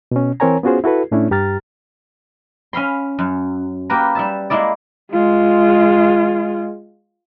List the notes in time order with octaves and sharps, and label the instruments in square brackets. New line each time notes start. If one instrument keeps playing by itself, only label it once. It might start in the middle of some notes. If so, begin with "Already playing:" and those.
[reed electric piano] B2 C#4
E3 C4 A#4 C#5 G#5 A#5
B3 C#4 F4 F#4 G#4 C5
E4 F#4 A4 B4
A2 A3 C#4 D4 E4
G2 G4 A#5 F6 A6
[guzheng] C#4 F5 B5 C6
F#2
A#3 F#4 G4 A#4 B4 A#5
G3 E5 A5
G#3 A#3 E4 D5
[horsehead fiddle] G#3 F4